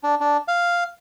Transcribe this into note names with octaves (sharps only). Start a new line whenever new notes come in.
D4
D4
F5